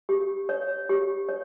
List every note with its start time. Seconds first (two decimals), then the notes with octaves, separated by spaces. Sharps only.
0.09 G4
0.49 C#5
0.89 G4
1.29 C#5